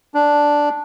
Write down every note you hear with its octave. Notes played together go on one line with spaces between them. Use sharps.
D4